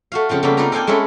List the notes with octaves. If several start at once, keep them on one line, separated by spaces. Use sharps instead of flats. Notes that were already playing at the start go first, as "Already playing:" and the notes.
A3 F#4 F5
C#3 F3 C4 F4
C#3 G3 A#3 B3 A4
C4 D#4 F4 A#4 D5 A#5
A4 A#4 D5 F5 G5 G#5
G#3 A3 C#4 E4 A4